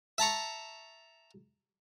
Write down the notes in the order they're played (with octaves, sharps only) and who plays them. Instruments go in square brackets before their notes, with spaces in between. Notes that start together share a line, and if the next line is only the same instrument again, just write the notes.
[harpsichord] E5 A5 A#5 C#6